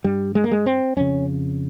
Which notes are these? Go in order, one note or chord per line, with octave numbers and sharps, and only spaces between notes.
G2 G3
G#3
A#3
G#3
C4
F2 C#3 C#4